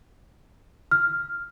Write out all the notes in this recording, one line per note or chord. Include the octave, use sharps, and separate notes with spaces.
F6